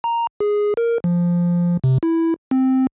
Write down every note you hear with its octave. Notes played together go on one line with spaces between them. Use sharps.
A#5
G#4
A#4
F3
C3
E4
C4